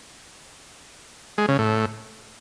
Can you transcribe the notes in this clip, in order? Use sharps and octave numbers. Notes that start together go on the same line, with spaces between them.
G#3
C#3
A2